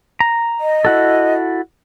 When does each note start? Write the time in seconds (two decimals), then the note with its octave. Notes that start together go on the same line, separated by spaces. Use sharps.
0.20 A#5
0.60 D#5
0.85 E4 F#4 A4